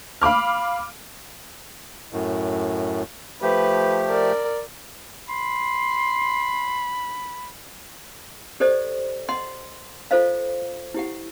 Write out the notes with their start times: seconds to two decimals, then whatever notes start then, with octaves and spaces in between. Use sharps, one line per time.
0.21 F5 B5 D6 F6
2.13 F#2 A2
3.42 F3 A3 G4 B4
4.08 A#4 D5
5.29 B5 C6
8.60 G4 A4 C5 D5 D#5
9.29 D#5 F#5 C6
10.11 F4 A4 C5 D#5 F5
10.94 E4 G4 F#5